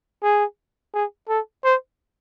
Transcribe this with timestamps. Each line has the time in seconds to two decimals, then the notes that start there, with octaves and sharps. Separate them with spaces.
0.23 G#4
0.94 G#4
1.29 A4
1.64 C5